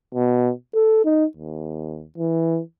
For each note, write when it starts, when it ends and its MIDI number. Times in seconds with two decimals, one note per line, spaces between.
0.14 0.51 47
0.75 1.02 69
1.05 1.25 63
1.37 2.05 39
2.18 2.60 52